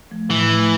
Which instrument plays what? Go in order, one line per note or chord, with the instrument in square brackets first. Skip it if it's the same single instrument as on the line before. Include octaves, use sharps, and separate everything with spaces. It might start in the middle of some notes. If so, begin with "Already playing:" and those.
[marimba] F3 A3
[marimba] A2 [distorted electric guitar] E3
[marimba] F3 A3